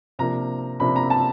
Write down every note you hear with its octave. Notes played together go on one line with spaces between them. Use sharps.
C3 F3 A#3 D4 A#5
C3 F3 A#3 D4 B5
A#5
A5